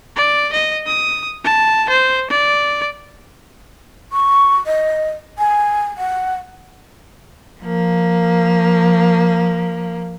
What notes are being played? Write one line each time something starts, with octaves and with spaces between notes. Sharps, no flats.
D5
D#5
D#6
A5
C5
D5
C#6
D#5
G#5
F#5
F3 A#3